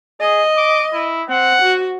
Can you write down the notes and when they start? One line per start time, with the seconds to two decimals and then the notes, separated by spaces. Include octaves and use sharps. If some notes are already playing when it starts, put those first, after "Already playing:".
0.20 G#4 D#5
0.57 D6
0.93 E4
1.29 C4 F#5
1.62 F#4